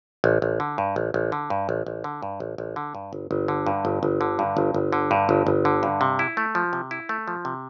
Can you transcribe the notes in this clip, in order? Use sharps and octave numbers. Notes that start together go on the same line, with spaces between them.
A1
A1
D3
G2
A1
A1
D3
G2
A1
A1
D3
G2
A1
A1
D3
G2
G1
G1
D3
G2
G1
G1
D3
G2
G1
G1
D3
G2
G1
G1
D3
G2
C3
E4
A3
F3
C3
E4
A3
F3
C3